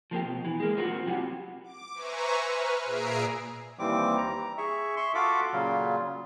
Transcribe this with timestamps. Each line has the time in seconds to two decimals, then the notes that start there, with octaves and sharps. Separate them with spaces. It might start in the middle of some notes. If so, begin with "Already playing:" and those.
0.11 F3 A#3 C4 G4
0.25 B2
0.45 E3
0.60 G#3 A#3
0.77 A#3 C4 F4 F#4
1.06 C3 F#3 C4 E4 G4 F#5
1.64 D6
1.95 B4 C5 E5 G#5 A#5 C#6
2.47 B4 F6
2.84 A#2 G#4 E5 A#5 C7 D7
3.79 D#2 E3 G3 C4 D6
4.18 A#5
4.58 G#4 E5 C#6
4.96 E5 C6 C#6
5.15 F4 F#4 A4 F5 B5 D6
5.53 A#2 C#3 F#3 F4